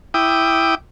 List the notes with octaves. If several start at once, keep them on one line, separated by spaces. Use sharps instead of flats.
E4 G5 D6 D#6